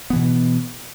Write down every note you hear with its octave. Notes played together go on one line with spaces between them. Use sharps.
B2 E3 B3